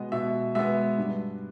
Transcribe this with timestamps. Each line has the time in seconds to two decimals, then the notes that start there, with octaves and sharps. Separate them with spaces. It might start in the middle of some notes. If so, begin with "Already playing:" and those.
Already playing: B2 G#3 B3 D#5
0.12 B2 E5
0.55 G#3 B3 E5
0.98 G2